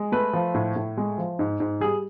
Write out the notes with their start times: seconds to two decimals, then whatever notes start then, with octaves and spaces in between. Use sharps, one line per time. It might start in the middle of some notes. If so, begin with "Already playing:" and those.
Already playing: G#3
0.12 A3 B4
0.33 F3
0.55 A2
0.76 A2
0.97 G#3
1.18 F3
1.39 G#2
1.60 G#2
1.80 G3 G#4